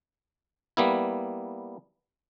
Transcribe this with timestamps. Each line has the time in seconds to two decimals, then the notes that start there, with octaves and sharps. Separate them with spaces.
0.77 G3 A#3 B3 E4